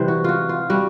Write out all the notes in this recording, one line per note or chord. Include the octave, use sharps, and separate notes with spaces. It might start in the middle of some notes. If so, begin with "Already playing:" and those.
Already playing: C3 E3 G3 C5
F#4
F4 F#4
F4
G3 F#4